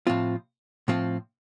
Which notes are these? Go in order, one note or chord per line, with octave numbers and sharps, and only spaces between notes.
A2 F3 C4 F4
A2 F3 C4 F4